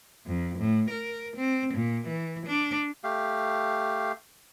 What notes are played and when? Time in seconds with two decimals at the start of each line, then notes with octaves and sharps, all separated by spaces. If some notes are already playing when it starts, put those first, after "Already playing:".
0.26 F2
0.59 A2
0.90 A#4
1.37 C4
1.74 A#2
2.08 E3
2.46 D4
3.04 A3 G4 F5